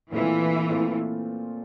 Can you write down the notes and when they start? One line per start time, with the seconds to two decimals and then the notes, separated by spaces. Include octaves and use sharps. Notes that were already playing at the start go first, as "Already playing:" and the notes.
0.12 A#2 E3 A3 C4 F4
0.70 A#2 A3 C4 F4